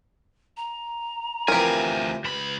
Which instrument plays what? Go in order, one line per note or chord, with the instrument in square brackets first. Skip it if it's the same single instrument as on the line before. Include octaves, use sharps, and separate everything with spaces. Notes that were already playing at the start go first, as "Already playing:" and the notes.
[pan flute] A#5
[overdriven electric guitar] D2 G#5 [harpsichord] E3 F3 C4 [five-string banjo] G4 A#4
[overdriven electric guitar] C#2 B5 [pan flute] B4